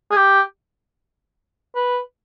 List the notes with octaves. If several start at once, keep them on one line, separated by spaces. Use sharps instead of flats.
G#4
G4
B4